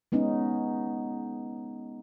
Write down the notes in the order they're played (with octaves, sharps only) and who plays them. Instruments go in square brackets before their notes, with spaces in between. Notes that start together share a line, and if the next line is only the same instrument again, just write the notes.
[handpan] G#3 B3 C#4 D#4